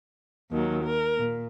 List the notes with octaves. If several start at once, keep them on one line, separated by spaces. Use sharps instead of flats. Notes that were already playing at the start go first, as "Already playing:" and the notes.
D#2 D#3 F#3
A#4
A#2